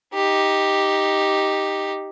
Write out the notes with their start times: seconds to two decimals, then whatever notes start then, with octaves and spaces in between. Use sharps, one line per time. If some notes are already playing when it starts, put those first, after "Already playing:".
0.14 D#4 G4